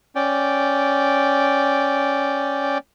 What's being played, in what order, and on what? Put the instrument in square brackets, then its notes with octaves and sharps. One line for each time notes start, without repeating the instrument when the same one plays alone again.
[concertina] C#4 D5 G5